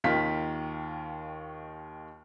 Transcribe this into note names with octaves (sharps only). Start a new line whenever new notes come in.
D#2 D#3 F4 B6